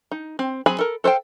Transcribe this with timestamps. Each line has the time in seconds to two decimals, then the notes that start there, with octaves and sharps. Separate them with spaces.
0.12 D#4
0.39 C4
0.66 F#3 C4 G#4 G#5 B5
0.79 A4 A#4
1.04 A4 C5 F5 G5